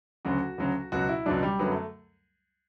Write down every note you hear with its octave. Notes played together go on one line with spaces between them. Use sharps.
D2 C#3 F#3 F#4
D2 C#3 F#3
C#2 B2 F#3 F#4
E4
C#2 B2 F#3 D4
G3
F#2 D3 F#3 B3
A3